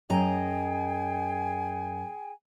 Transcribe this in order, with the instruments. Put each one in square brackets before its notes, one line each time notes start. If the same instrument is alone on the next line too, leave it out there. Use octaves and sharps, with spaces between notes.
[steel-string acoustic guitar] F#2 D#5 A#5 [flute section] G#4 G5 G#5